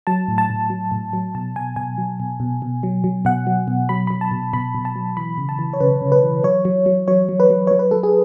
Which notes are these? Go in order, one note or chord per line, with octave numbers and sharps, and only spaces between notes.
F#3 A5
A2
A5
A2
F#3
A2
F#3
B2 A5
B2 G#5
B2 G#5
F#3
B2
B2
B2
F#3
F#3
B2 F#5
F#3
B2
F#3 B5
F#3 B5
A5
B2
B2 B5
B2
A5
F#3
E3 B5
C#3
A5
E3
C#5
C#3 B4
C#3
B4
E3
F#3 C#5
F#3
F#3
F#3 C#5
F#3
B4
F#3
F#3 C#5
B4
F#3 A4
G#4